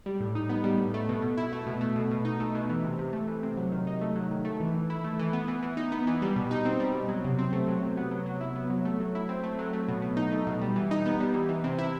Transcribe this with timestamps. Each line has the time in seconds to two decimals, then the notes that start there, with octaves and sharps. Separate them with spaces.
0.06 G3
0.20 A2
0.35 D#4
0.49 B3
0.64 G3
0.78 A2
0.94 A3
1.09 B2
1.22 B2
1.37 E4
1.53 A3
1.67 B2
1.81 A3
1.96 B2
2.11 B2
2.25 D#4
2.40 A3
2.55 B2
2.70 E3
2.84 C3
2.99 C3
3.13 A3
3.28 E3
3.43 C3
3.57 F#3
3.72 D#3
3.87 D#4
4.01 A3
4.16 F#3
4.31 D#3
4.45 A3
4.60 E3
4.74 E3
4.90 E4
5.04 A3
5.19 E3
5.33 B3
5.48 E3
5.63 E3
5.77 D#4
5.92 B3
6.07 E3
6.22 G3
6.36 B2
6.51 D#4
6.65 C4
6.80 G3
6.94 B2
7.09 F#3
7.24 C3
7.39 C4
7.53 A3
7.68 F#3
7.82 C3
7.97 B3
8.11 F#3
8.26 F#3
8.41 E4
8.56 B3
8.70 F#3
8.85 A3
9.00 F#3
9.15 E4
9.29 C4
9.43 A3
9.59 F#3
9.73 A3
9.88 B2
10.02 B2
10.17 D#4
10.32 A3
10.47 B2
10.61 G3
10.76 E3
10.91 D#4
11.05 B3
11.20 G3
11.34 E3
11.49 E3
11.64 C3
11.78 E4